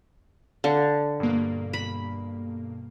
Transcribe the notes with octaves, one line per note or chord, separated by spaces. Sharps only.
D3 F5
G2 B2 A#3
B5